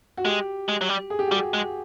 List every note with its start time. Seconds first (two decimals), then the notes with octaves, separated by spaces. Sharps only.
0.17 F#4
0.25 G#3 G4
0.69 G#3
0.81 F#3
0.89 G3
1.10 G#4
1.19 G4
1.28 F#4
1.32 G3
1.36 G4
1.54 G#3